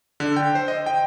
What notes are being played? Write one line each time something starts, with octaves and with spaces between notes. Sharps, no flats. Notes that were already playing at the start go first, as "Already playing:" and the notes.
D3
G5
C5
D#5
G5